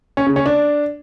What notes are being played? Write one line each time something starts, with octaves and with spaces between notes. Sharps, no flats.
C#4
C#3
C#4
D4